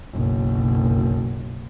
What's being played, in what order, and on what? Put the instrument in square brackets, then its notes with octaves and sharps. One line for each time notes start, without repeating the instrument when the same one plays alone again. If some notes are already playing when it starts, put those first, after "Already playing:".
[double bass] F#1 B1